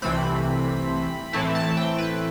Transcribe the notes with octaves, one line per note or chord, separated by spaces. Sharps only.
C2 C3 E3 A3 C4 B5
A2 E3 A3 C4 E4 A5
A5
G5
B4